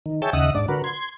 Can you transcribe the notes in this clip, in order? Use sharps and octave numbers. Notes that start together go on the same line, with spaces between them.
D#3
G#4 C#5 E5 G5 A5
D#2 C#3 D#5 E5 F#5 D#6
G#2 D4 D5
D3 F#4 A#4 B4
C6 G#6